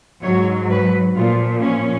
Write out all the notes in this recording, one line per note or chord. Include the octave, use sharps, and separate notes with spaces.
G#2 F#3 C#5
B4
A#2 F3 F4
C#4